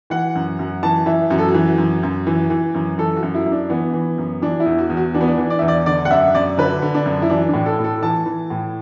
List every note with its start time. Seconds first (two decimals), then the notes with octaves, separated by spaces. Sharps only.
0.10 E3 F#5
0.35 F#2
0.59 F#2
0.83 E3 A5
1.06 E3 E5
1.30 F#2 F#4
1.38 A4
1.48 F#4
1.54 E3
1.78 F#2
2.03 F#2
2.27 E3
2.50 E3
2.74 F#2
2.98 E3 A4
3.16 F#4
3.23 F#2
3.35 E4
3.46 F#2
3.52 D4
3.70 E3 B3
3.94 E3
4.18 F#2
4.42 E3 D4
4.60 E4
4.66 E2
4.78 F#4
4.90 E2
4.97 F#4
5.14 E3 D4
5.21 B3
5.28 D4
5.38 E3
5.50 D5
5.59 E2 E5
5.68 D5
5.86 D3 D5
6.05 F#5
6.11 F#2 E5
6.35 F#2 D5
6.58 D3 B4
6.82 D3
6.94 D4
7.06 F#2
7.22 E4
7.29 E3 D4
7.49 A2 D4
7.66 A4
7.79 A2
7.84 A4
8.02 E3 A5
8.26 E3
8.50 A2